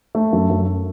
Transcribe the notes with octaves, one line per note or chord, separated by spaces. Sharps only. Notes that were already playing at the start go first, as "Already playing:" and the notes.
A3
F#2
F#2